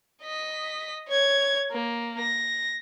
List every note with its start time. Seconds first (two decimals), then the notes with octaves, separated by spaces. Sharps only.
0.22 D#5 B6
1.08 C#5 G#6
1.72 A#3
2.20 A#6